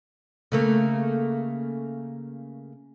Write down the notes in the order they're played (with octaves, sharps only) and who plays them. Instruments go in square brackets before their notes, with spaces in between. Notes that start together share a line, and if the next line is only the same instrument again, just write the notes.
[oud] C#3 A3 A#3